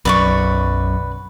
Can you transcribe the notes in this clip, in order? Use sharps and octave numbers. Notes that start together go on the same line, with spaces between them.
B1 F#2 B4 D5 C#6